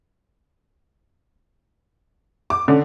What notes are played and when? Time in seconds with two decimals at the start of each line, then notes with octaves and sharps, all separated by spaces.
2.50 D6
2.68 D3 C#4